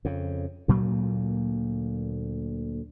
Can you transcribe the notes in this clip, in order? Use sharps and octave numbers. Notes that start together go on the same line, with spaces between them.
F2 C#3
D2 A#2 F#3 A#3